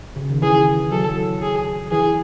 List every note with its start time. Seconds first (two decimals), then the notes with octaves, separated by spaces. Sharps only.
0.16 C#3
0.29 D#3
0.42 E3 G#4
0.92 F#3 A4
1.42 G#4
1.91 E3 G#4